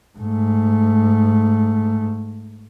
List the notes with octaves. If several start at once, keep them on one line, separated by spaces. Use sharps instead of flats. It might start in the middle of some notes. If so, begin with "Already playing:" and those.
G#2 A3